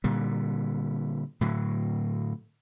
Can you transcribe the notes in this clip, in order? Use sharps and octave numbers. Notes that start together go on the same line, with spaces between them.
A#2 D3 G3
A2 D3 F#3